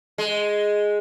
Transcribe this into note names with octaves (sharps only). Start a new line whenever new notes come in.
G#3